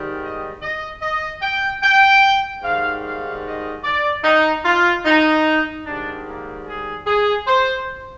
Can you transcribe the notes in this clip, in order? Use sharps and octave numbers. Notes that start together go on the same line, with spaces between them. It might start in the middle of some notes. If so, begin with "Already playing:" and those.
Already playing: G#2 D#3 G3
D#5
D#5
D#5
G5
G5
G#2 D#3 G3 F5
F5
D#5
D5
D#4
F4
D#4
G#2 D#3 G3 D4
A#3
G#4
G#4
C5